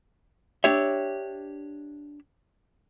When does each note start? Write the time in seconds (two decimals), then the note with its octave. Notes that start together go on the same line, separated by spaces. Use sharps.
0.64 D4 G4 C#5 E5